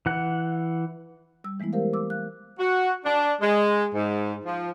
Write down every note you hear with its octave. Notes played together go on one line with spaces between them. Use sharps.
E3 F#5
G3 E6
E3 G#3 A3 B3 E4
G4 A#4 C5 F5
D6 E6
F5 F#6
F#4
D4
G#3
G#2
F3